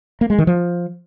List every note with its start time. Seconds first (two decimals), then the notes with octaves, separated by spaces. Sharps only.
0.21 A#3
0.30 G#3
0.38 D#3
0.47 F3